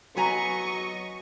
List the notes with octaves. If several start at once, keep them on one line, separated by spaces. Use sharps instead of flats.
F#3 B3 D#5 G#5 A#5 C#6